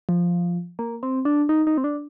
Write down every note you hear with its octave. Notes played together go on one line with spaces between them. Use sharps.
F3
A#3
C4
D4
D#4
D#4
C4
D4